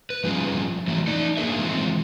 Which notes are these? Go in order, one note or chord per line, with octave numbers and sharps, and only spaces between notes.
B4
F3 G3 C#4 F4 G#4
E3 F#3 A3
D#4 D5
A3 A#3 D4 G#4 B4 E5
D#3 E3 G#3 C4 F4